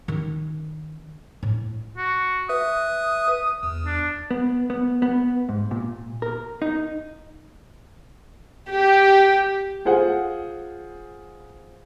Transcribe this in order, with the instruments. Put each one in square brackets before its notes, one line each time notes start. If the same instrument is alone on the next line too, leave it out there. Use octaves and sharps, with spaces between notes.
[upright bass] D#3 C#4
A2
[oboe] F#4
[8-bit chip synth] B4 E5 F#6 [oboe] D#6
[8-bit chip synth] E2
[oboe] D4
[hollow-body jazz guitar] B3
B3
B3
G#2
A#2
A#4
D#4
[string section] G4
[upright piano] F4 G#4 C5 F#5